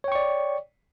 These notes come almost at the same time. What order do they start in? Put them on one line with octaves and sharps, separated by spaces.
C#5 G5 C#6 D5